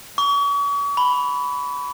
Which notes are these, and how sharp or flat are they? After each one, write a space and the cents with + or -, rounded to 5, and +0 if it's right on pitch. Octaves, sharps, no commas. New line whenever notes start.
C#6 +40
B5 +5